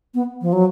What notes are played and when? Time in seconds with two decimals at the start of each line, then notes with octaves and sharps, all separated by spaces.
0.14 B3
0.42 F3
0.53 F#3